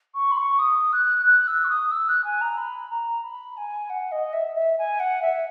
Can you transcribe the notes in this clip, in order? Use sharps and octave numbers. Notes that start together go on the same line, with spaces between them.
C#6
B5
C#6
D#6
F#6
F#6
E6
C#6
D#6
E6
F#6
G#5
A#5
B5
A#5
B5
G#5
F#5
D#5
E5
E5
G#5
F#5
E5